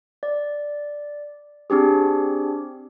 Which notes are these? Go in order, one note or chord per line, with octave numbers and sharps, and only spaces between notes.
D5
C4 D4 G4 G#4